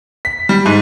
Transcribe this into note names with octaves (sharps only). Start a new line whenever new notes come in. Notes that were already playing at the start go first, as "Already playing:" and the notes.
B6
G3
G#2